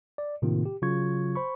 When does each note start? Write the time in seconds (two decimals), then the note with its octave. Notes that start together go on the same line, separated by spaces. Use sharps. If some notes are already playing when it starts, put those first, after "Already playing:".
0.18 D5
0.42 A2 C3 D#3 A#3 C4 F4
0.66 G4
0.82 C#3 F#3 F4 C#6 G#6
1.36 C5 B5 C#6